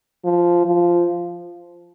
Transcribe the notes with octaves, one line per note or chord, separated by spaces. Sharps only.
F3
F3